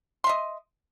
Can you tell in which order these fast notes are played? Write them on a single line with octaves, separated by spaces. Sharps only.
C6 E5 D#5